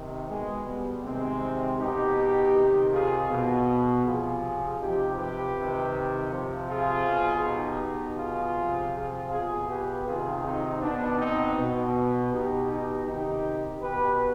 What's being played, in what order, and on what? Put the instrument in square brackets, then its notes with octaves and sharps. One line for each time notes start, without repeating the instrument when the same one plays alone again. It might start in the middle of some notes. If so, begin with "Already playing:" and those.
Already playing: [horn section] C3 D#3
B2 G#3
G3 B3
C3 D#3 G#3 C4
B2 D#4 G4
C3 D#3
F4 G#4
B2
C3 F3 F4 G#4
C3 F3 D#4 G4
G4 B4
C3 D#3
C3 F3
F4 G#4
B2
D#4 G4
B2
F4 G#4
C3 F3
F4 G#4
B2 F4 G#4
G4 B4
C3 D#3 F4 G#4
C4 D#4
B2 B3 D4
C4 D#4
B2
B2 D#4 G4
D#4 G4
C3 D#3 D#4 G4
B2 G4 B4